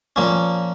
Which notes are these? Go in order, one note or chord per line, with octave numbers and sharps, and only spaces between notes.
A#2 F3 A#3 C#4